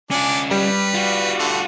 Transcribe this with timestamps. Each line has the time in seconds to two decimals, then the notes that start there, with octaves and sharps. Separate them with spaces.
0.11 C#4 D4 F4 D5 G#5
0.51 G3 B4
0.95 F4 F#4
1.39 D3 A3 F#5